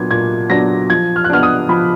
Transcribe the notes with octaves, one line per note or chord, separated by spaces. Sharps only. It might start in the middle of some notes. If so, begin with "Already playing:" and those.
Already playing: A#2 F#3 B3 D4 G#6
A#2 G#6
F#3 B3 D4 A#6
F3 G#6
F6
F#6
B3 D4 F6
D#6
F3 B5